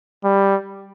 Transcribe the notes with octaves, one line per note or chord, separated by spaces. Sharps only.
G3